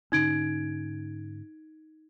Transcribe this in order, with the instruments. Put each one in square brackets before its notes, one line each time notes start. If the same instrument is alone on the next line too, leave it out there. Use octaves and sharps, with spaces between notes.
[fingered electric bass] G#2 D3 C#4 [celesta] D#4 G#6 D7